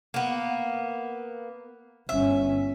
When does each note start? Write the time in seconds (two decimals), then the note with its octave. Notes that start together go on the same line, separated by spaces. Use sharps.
0.14 A#3 B3
2.09 G1 C#4 E5